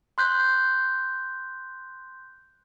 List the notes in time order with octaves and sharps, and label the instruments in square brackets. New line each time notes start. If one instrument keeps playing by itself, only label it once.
[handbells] C6 F#6 G6